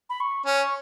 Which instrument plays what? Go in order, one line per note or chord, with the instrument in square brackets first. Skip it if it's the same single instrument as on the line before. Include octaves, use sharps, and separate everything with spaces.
[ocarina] B5
C#6
[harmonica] C#4 [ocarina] C#6